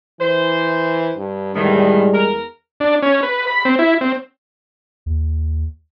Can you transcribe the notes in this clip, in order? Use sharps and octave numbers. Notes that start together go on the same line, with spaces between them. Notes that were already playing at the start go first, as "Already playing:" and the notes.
E3 C5
G2
E2 A2 D3 D#3 G3 G#3
E2 A#4
D4
C#4
B4
B5
C4
E4
C4
D#2